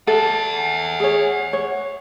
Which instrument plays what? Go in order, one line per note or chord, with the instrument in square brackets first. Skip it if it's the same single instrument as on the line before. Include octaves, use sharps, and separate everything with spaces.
[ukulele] A4 [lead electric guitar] E5 F#5
[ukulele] G#4 C#5
C#5